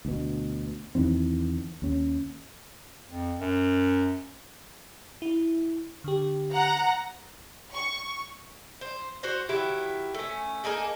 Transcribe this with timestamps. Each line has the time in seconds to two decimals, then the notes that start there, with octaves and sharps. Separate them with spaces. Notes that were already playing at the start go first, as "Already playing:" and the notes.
0.05 D2 B2
0.95 E2 D#3 E3 C4
1.82 D#2 C#4
3.09 F2
3.40 F#2
5.22 E4
6.04 D3 G4
6.52 F#5 A#5
7.73 C#6
8.81 C5
9.23 F#4 C5 C#5
9.49 D#3 F#3 E4 G4
10.14 A3 C#4
10.64 A#3 D#4 G#4 A4